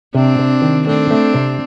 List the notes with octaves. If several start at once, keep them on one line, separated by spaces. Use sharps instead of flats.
C3 C4 D4
C3
D#3
A3 C4 D4
A3
C3